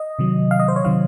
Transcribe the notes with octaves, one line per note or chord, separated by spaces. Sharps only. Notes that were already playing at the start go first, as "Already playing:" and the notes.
Already playing: D#5
C3 D#3 F#3
F5
D#5
C5
C#5
C3 D#3 F#3 F5